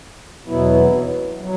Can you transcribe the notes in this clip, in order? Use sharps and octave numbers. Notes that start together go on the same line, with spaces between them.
E2 B2 F#3 B3 E4
F#3